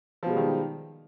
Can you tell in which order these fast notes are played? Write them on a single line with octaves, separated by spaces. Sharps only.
F3 B2 G#3 G3 D#3